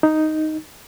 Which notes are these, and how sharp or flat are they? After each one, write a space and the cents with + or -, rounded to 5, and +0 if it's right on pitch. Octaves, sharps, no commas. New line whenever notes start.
D#4 +0